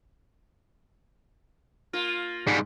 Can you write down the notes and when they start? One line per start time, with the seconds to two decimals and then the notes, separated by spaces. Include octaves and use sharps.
1.93 A#3 F4
2.47 G#2 G3